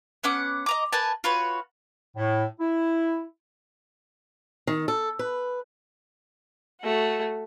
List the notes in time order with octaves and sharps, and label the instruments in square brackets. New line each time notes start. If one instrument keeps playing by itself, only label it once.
[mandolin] B3 C#4 F#5 D6
D#5 A#5 D6
A#4 B4 G#5 A5
F4 F#4 B4 C#5
[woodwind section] A2
E4
[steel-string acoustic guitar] D#3
A4
B4
[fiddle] A3 F#4